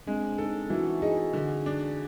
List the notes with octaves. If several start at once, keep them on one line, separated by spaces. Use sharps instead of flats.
G#3 C4 D4
C#4 D#4 A4
E3 E4 F#4
D#4 F#4 G#4
D3
D4